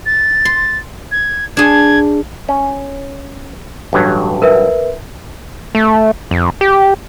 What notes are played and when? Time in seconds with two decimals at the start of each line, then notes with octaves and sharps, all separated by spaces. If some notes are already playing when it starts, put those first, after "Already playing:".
0.06 A6
0.45 C6
1.12 G#6
1.57 D4 G#4 G#6
2.49 C#4
3.93 A1 G2 F#3
4.42 A#4 B4 E5
5.75 A3
6.31 F2
6.61 G4